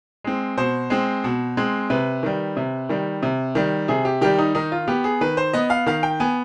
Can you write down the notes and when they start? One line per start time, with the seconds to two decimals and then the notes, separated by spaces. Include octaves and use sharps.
0.24 G#3 C4
0.57 B2 C5
0.90 G#3 C4
1.24 B2
1.57 G#3 C4
1.90 C3 B4
2.23 D#3 G3
2.57 C3
2.89 D#3 G3
3.23 C3
3.55 D#3 G3
3.88 C3 G#4
4.05 G4
4.21 D#3 G3 G4
4.39 D#4
4.55 D#3 D#4
4.72 F4
4.88 B3 G4
5.04 G#4
5.21 D#3 B4
5.37 C5
5.53 B3 D#5
5.70 F5
5.86 D#3 F5
6.03 G5
6.20 B3 G#5